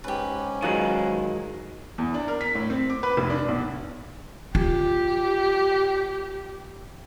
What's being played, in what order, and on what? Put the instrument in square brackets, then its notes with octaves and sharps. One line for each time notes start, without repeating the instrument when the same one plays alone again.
[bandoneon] G#2 C#4 [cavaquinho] G4 B4
[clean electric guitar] D#3 F#3 G#3 [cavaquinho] F4 B4
[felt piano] E2
D4
A#4
B6
A2
C4
D6
B4
F1
D4
B1
[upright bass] F4 [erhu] G4